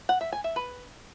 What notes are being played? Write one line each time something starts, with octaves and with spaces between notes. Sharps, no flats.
F#5
E5
G#5
E5
B4